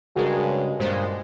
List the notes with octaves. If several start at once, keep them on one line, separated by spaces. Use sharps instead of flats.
G2 C#3 G#3 F#4 G#4 A#4
G2 A#2 G#3 C5